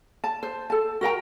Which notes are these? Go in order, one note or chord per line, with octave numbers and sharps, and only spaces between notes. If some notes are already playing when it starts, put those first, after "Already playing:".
A5
C5
A4 A5
F#4 A#4 G5 A#5